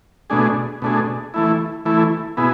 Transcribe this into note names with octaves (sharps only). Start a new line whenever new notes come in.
B2 A3 D4 G#4
B2 A3 D4 G#4
E3 A3 E4
E3 A3 E4
B2 B3 E4 G#4